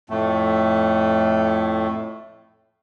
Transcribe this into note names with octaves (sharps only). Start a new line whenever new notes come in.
F2 A2 A3